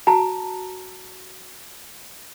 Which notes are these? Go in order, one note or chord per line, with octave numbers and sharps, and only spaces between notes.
F#4 A5 A#5